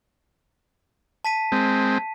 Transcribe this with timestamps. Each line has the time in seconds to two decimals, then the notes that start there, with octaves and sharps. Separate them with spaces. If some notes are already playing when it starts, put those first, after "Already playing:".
1.25 A5 B6 D#7
1.52 G#3 C4